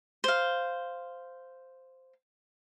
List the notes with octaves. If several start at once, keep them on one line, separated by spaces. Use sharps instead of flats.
C5 F5